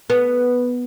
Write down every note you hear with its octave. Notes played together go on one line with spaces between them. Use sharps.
B3